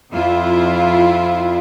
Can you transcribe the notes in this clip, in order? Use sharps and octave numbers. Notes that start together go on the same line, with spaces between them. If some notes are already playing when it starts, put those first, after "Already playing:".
F2 E4 F4